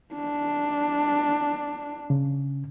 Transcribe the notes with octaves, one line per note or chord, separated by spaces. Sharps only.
D4
C#3